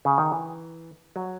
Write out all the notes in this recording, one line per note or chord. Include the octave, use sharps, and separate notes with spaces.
C#3
D#3
E3
F#3